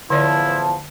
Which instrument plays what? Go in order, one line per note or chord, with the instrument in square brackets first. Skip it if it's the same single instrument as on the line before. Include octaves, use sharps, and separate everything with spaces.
[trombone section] E2 A2 F3 [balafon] D3 C#5 D5 [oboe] E4 [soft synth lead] A5